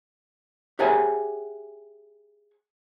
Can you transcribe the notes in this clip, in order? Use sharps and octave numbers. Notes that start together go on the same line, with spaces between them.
G4 G#4 C#5 E5 F#5 G#5